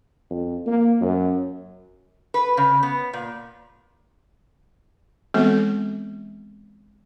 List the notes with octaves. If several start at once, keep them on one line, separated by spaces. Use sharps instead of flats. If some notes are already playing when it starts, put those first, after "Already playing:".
F2
A#3
F#2
B4
C#3
B3
A#2
E3 G#3 B3 C4 F#4 A4